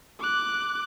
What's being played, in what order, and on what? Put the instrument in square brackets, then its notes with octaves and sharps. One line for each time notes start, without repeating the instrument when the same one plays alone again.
[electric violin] D6 F#6